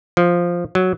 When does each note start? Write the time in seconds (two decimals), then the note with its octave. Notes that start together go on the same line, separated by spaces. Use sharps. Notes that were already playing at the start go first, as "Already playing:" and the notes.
0.17 F3
0.75 F#3